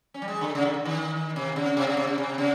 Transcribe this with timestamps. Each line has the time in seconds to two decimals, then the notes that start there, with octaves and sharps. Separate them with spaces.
0.14 C#4
0.22 G3
0.28 G#3
0.41 D3
0.55 C#3
0.65 D3
0.85 D#3
1.36 C3
1.56 C#3
1.77 C3
1.87 C#3
1.97 C3
2.07 C#3
2.18 C3
2.38 C#3